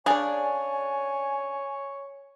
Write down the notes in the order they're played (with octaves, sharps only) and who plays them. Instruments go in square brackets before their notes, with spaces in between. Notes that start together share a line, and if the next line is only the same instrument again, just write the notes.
[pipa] C#3 C#4 D4 [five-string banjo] G#4 D5 [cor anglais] C#5 [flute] G#5